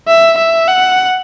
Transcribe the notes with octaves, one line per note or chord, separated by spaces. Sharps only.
E5
E5
F#5